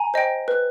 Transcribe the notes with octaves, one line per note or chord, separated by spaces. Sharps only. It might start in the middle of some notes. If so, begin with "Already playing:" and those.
Already playing: G#5 A#5
C5 D#5 G5
B4